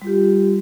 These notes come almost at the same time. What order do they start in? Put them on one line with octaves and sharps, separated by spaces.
G3 F4 G4